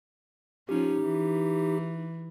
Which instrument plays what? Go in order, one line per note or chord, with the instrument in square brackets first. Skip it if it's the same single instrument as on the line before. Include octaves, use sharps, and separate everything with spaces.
[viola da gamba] F3 C#4 [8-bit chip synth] D#4 G4
[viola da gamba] E3